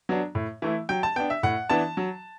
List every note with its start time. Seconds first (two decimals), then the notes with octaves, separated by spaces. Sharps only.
0.09 F#3 B3 D4
0.35 A2
0.62 E3 A3 E4
0.89 F#3 G5
1.03 A5
1.16 B3 D4 G5
1.30 E5
1.43 A2 F#5
1.70 E3 B3 D4 A5
1.97 F#3